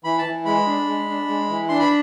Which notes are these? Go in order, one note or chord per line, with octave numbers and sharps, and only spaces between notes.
E3 B5
A5
E3
G#3 B5
D4
G#3
D4
G#3
E3
D4 C6
B5